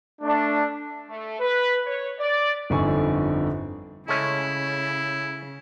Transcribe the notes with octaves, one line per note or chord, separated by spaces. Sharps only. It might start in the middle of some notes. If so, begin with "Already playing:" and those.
A3 D4
A3
B4
C#5
D5
G1 F2 D3 D#4 G#5 C#6
C#3 G#3 A3 C#4 E4